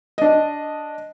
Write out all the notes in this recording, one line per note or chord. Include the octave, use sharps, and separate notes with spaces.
D4 D#5